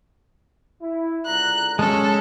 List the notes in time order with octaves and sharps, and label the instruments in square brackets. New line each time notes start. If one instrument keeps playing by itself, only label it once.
[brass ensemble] E4
[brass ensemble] C#2 D3 A#5 [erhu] F#6
[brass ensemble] F#2 D#3 [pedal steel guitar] G#3 C#4 [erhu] A4